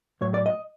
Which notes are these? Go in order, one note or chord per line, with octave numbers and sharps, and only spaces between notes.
A2 F#3 C#5
D5
D#5